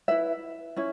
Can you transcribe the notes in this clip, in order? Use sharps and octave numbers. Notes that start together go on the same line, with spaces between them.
E4 B4 E5
C#4 E4